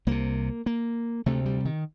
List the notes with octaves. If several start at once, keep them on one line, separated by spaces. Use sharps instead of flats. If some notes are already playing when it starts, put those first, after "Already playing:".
C2 C3 A#3
A#3
D2 C3 A3
G3
D#3